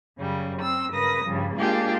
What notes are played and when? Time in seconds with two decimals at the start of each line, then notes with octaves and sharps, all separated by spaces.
0.20 F#2 C#3 G3
0.61 C4 E6
0.91 G2 C#3 A#4 B4 D#6 A#6
1.26 G2 C#3 F3 G3
1.57 G#3 A#3 D4 F4 G4 G#4